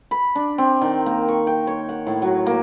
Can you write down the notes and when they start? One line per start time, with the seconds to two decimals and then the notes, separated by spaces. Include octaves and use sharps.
0.11 B5
0.36 D4
0.58 C4
0.82 D#3
1.06 A#3
1.28 C#6
1.47 G5
1.67 C#5
1.89 F#5
2.07 A2
2.22 F#3
2.46 A#3